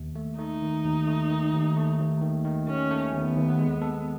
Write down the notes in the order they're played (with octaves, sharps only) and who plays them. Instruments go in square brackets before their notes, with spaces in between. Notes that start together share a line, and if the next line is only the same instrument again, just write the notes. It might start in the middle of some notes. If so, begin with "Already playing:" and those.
Already playing: [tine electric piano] D#2
A3
[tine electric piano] A3 [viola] D#4
[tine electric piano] D#3
D#2
A3
D#3
D#2
A3
D#2
D#3
D#3
[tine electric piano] D#2 [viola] C#4
[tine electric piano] A3
[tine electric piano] D#2 [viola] B3
[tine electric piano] D#2
G#3
A4